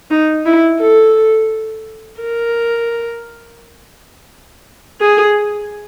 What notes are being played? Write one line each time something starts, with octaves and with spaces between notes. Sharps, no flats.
D#4
E4
A4
A#4
G#4